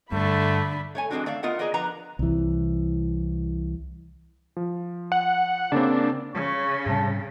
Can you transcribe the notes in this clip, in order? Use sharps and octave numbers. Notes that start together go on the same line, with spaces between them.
G2 D3 A3 B5
A3 C#5 G#5
E3 G#3 B3 C4 D4 F#4
A3 D5 E5 F5
B3 F4 A#4 D#5 E5 F#5
G#4 A#4 B4 D5 D#5
F3 D4 A#4 B4 F#5 A#5
C2 E3
F3
F#5
C#3 A#3 C4 D4
C#3 C#5
G#2 C3 G3 A5